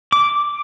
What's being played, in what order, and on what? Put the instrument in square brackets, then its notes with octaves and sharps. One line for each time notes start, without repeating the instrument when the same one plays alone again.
[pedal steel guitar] D6